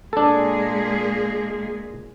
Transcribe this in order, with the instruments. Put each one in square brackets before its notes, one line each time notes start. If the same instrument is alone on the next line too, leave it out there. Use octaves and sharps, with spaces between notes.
[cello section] A#2 G#3 G#4 [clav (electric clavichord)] D4 A4